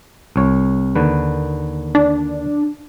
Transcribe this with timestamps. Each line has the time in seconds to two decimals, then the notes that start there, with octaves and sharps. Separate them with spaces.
0.36 C2 C#5
0.95 D#2 D3 B4
1.95 D4